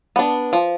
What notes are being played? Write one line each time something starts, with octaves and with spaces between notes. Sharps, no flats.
B3 D4
F3